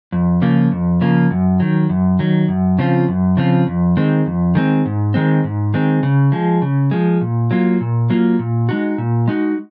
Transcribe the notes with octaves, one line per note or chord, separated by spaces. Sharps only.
F2
C#3 F3 A#3 F4
F2
C#3 F3 A#3 F4
F#2
D#3 F#3
F#2
D#3 F#3
F#2
C#3 F3 C4 F4
F#2
C#3 F3 C4 F4
F2
D#3 G#3 C4
F2
D#3 G#3 C4
G#2
D#3 G#3 C4
G#2
D#3 G#3 C4
C#3
F3 G#3
C#3
F3 G#3
A#2
F#3 A#3 F4
A#2
F#3 A#3 F4
A#2
G#3 D#4 F#4
A#2
G#3 D#4 F#4